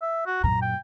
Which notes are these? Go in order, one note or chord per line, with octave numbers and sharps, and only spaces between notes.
E5
F#4
F#2 A#2 A#5
G5